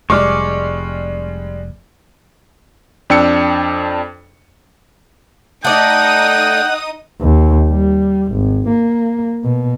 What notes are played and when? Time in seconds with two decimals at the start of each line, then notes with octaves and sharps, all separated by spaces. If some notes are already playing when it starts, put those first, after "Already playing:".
0.10 F1 G3 G#3 C#6 D6 F6
3.10 F2 D4 G5 E6 C#7
5.65 A3 D#4 D5 F#5 G5 D#6
7.21 D#2
7.69 G3
8.32 G#1
8.69 A#3
9.44 B2